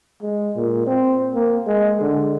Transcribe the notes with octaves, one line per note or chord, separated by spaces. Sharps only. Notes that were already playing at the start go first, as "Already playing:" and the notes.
G#3
A#2
C4
A#3
G#3
D3